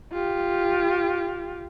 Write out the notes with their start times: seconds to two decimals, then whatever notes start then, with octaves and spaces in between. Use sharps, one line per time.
0.12 F4 G4